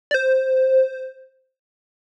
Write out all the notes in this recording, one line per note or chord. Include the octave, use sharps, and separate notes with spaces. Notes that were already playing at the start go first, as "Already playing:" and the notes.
D5
C5